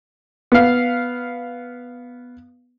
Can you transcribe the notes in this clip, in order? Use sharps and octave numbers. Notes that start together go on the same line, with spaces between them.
B3 F5